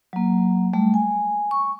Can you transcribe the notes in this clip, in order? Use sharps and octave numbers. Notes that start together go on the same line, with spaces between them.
F#3 A#3
G3 A3
G#5
C#6